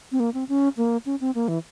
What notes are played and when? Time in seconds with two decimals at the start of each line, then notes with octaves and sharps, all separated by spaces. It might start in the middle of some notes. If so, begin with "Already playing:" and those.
0.12 C4
0.20 A#3
0.34 C4
0.49 C#4
0.77 A#3
1.06 C#4
1.21 C4
1.35 A#3
1.48 E3